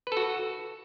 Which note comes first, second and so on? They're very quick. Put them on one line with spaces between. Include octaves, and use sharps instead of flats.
B4 A4 F#4